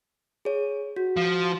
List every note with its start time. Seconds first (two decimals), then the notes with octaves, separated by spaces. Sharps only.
0.45 G#4 C#5
0.96 F#4
1.16 F3